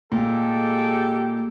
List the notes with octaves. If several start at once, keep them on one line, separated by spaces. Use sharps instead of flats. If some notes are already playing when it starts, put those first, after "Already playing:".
A#2 G#3 G4 A4